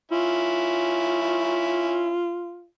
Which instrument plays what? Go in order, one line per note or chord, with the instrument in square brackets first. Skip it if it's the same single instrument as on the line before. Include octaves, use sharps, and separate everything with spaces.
[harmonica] C#4 E4 [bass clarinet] F4